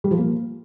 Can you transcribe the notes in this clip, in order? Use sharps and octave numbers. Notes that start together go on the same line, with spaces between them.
G3
F3
A#3